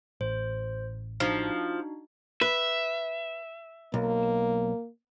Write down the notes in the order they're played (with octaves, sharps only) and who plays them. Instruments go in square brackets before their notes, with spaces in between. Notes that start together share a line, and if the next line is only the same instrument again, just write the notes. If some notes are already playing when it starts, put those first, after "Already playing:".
[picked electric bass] A1 [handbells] C5
[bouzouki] F3 [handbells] D4 D#4 F#4
[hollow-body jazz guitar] B4 [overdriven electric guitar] E5
[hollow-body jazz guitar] B1 [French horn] A#3